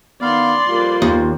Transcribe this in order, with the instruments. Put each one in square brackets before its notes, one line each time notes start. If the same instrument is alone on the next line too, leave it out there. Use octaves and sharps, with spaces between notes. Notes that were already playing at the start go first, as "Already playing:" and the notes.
[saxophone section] D#3 F5 [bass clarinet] B3 [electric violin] D5 C6
[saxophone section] F2 G3 A#3 [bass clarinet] F4
[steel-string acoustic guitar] D#2